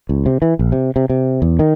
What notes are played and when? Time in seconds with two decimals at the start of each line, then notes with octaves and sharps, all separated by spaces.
0.09 C#2
0.26 C3
0.42 E3
0.59 A#1
0.72 C3
0.96 C3
1.10 C3
1.42 E2
1.59 D#3